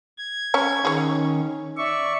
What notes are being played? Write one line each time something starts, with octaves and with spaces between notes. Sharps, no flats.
G#6
C#4 C#5
D#3 C#4 G#4 C#5
D5 E5 C#6